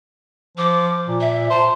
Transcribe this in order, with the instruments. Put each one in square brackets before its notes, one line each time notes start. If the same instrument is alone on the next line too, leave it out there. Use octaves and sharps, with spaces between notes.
[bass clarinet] F3 [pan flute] D6
[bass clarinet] A#2
[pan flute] E5
[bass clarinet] C5 [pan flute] A5